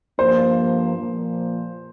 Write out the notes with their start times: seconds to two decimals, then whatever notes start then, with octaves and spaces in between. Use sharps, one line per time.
0.19 G2 F3 A#3 C5
0.96 A#2 F3 A#3